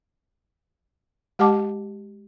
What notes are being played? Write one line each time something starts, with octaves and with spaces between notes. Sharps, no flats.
G#3 G4 D#5 F#5 A5 D6